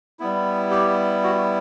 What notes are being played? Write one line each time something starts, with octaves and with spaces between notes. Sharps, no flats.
G3 B3 E4
G4
F#4